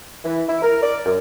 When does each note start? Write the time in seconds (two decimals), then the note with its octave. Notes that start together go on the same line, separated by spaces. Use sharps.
0.25 E3
0.49 E4
0.62 A#4
0.83 D5
1.05 F#2